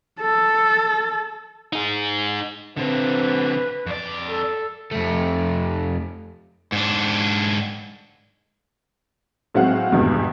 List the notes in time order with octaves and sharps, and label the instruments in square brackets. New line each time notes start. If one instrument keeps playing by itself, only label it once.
[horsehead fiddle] A4
[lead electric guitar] D#4 G#4
[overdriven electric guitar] D3 C4 [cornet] B4
[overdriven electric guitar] F2 D5
[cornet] A4
[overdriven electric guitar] F2 A3
G#2 D4
[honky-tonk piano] A2 F#3 G#3 C4 F5 F#5
G#1 E2 G2 B2 G3 G#3